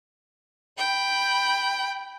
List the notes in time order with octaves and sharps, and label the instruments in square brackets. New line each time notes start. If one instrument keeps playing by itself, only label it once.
[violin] G5 B5